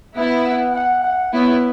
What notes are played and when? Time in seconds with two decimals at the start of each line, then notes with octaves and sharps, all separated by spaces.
0.16 B3 E4 E5
0.46 F#5
0.75 F#5
1.04 F#5
1.33 B3 E4 C#5